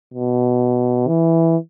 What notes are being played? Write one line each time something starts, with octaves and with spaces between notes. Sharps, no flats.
B2
E3